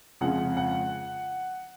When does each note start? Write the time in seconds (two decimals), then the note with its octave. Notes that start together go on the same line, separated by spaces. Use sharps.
0.21 F2 C#3 F3 G#3 F#5
0.57 F#5